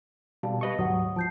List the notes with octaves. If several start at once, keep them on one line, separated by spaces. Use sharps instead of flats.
B2 G3 F5 A5
G4 B4 D#5 F5 C#6 A#6
D2 G#2 F#3 F#5 D#6
F3 A5 G6 C7